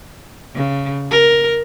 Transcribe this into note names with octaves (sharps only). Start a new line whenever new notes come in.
C#3
A#4